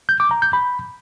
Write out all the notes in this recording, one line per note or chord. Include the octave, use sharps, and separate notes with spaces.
G6
D6
A#5
G6
B5